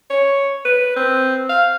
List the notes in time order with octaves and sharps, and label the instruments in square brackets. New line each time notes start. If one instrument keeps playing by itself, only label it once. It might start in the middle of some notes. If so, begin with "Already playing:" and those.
[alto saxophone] C#5
B4
C4
F5